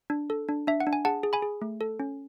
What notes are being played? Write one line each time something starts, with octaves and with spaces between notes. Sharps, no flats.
D4
A4
D4
D4 E5
F#5
D4
G#5
G#4 F#5 A5
G#4
G#5 B5
G#4
A3
A4
C#4